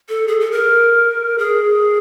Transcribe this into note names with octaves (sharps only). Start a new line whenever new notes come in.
A4
G#4
A4
A#4
G#4